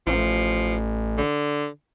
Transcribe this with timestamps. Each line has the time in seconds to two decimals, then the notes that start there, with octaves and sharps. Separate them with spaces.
0.07 A1 F3
1.18 D3